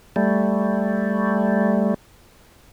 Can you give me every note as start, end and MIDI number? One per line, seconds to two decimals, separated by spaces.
0.16 1.94 55
0.16 1.94 57